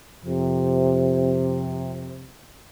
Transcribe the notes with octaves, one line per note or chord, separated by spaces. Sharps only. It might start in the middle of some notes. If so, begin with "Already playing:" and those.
F2 C3